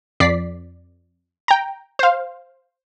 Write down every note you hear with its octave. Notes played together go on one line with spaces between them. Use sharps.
F2 D5 B6 C7
G5 A#5
C5 F5